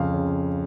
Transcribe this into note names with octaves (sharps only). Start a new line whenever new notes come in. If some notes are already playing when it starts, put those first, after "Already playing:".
Already playing: F2 C#3 F5
C#3